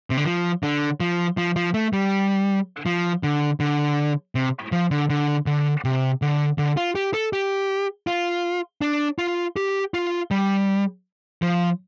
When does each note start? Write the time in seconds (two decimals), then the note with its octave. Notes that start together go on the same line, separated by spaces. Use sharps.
0.10 C3
0.17 D3
0.25 F3
0.63 D3
1.00 F3
1.37 F3
1.56 F3
1.74 A3
1.93 G3
2.86 F3
3.23 D3
3.60 D3
4.35 C3
4.72 F3
4.91 D3
5.10 D3
5.46 D3
5.85 C3
6.22 D3
6.58 D3
6.77 F4
6.95 G4
7.14 A4
7.33 G4
8.07 F4
8.81 D4
9.18 F4
9.56 G4
9.94 F4
10.31 G3
11.42 F3